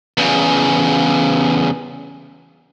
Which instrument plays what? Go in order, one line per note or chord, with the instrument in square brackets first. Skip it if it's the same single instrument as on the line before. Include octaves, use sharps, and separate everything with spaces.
[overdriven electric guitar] E2 C#3